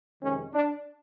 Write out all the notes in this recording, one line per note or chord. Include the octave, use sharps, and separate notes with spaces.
F2 C3 D#3 G#3 C#4
D4